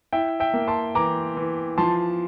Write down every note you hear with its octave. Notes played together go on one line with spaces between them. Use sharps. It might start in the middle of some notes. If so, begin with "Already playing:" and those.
E4 E5 G5
E5 G5
A#3
A5 C6
E3 A#5 D6
E3
F3 A5 C6